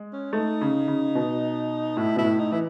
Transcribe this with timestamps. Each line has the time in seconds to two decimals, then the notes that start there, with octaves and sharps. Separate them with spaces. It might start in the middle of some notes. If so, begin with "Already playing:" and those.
Already playing: G#3
0.13 C#4
0.33 A3 D#4
0.61 C#3
0.88 C#3
1.15 B2
1.97 A2 E4
2.16 B2 E4
2.25 A2
2.39 D#4
2.52 E3 E4